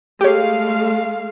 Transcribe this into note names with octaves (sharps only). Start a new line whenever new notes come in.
G#3 A3 G4 C#5 F5